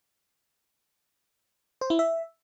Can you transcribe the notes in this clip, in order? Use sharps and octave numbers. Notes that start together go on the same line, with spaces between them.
C5
E4
E5